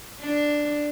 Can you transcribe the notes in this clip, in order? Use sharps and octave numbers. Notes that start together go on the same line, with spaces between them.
D4